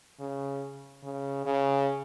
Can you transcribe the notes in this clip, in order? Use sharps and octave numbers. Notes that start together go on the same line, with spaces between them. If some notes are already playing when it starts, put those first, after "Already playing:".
C#3
C#3
C#3